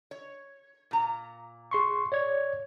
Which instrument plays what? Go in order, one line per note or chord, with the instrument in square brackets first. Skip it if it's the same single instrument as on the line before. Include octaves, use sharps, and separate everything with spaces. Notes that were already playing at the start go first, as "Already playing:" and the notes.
[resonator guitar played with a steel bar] C#5
A#2 A#5
[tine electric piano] G#4 C6 C#6
C#5 D5 G#6